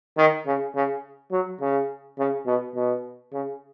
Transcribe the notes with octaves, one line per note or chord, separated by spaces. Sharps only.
D#3
C#3
C#3
F#3
C#3
C#3
B2
B2
C#3